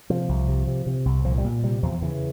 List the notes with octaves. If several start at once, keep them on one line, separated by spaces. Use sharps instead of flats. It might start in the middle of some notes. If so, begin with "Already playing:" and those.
C3 F3
C2
C3
C3
C3
C2
A#2 F3
G3
A#2
C3 G3
E2 F3
C#3 E3